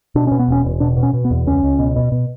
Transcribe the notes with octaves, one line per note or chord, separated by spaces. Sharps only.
B2 D4
B2 C#4
B3
E1 C#4
E1
B2 D4
B2
C#4
B2
B3
E2
C#2 C#4
C#2
B2
B2
B2